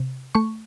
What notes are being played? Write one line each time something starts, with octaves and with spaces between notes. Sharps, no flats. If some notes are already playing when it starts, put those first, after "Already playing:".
Already playing: C3
A3 C#6